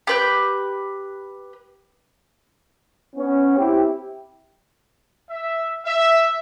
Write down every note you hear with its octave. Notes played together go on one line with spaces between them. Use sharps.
G4 B4 G6
B3 C#4
C4 E4 G4
E5
E5